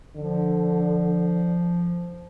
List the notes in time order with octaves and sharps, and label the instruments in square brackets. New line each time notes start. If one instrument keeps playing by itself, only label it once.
[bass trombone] D3 [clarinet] F3